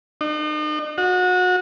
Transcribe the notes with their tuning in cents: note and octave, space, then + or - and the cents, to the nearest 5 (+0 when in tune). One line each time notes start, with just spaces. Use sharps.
D#4 -40
F#4 -25